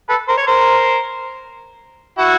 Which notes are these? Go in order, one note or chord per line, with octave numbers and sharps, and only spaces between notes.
A4 B4
A#4 C5
C#5
A#4 C5
E4 F#4